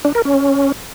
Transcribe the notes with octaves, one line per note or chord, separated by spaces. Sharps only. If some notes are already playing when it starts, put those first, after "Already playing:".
D4
A#4
C#4